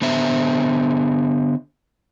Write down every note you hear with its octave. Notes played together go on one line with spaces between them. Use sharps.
D3 B3 C5 E5